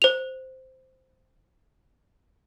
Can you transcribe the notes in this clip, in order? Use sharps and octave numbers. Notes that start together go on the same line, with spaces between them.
C5 F7